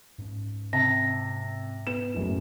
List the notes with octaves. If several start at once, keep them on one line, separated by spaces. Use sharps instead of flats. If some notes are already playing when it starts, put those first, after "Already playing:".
G#2 C#4
C3 A5 A#6
B3 E7
F#1 F#2 A2